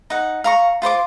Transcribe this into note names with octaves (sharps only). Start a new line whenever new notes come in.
D#4 F#5
F5 A#5 C#6
F4 C5 C6 D6